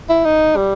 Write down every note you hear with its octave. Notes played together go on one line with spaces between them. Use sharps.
E4
D#4
G3